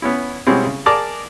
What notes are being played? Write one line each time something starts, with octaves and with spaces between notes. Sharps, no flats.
B3 C#4 E4
B2 G3 G#3 C4 C#4 E4
C#3
G#4 A#4 D5 A5 D6